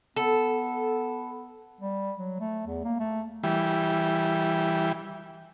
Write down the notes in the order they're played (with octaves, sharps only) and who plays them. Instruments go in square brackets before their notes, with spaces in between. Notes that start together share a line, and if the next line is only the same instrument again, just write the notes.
[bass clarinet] B3 [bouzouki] A4
[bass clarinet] G3
F#3
A3
E2
A#3
A3
[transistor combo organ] E3 G3